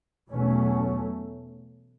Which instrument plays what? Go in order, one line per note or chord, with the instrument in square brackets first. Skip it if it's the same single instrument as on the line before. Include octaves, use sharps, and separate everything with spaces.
[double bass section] E2 B2 F#3 A3 C#4